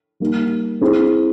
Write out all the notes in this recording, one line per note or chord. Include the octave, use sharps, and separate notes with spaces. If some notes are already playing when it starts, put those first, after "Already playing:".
G3 A#3 D#4
C4 E4 G#4